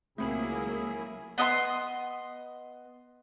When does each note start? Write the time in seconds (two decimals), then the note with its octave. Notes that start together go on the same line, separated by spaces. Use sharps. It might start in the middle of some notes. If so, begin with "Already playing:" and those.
0.18 C#2 F#3 A3 A#3 C4 E4 G#4 B5
1.38 B3 D#5 F5 C6